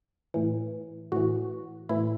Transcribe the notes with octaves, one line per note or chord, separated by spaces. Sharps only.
A2 E3
A2 E3 F#4
A2 E3 E4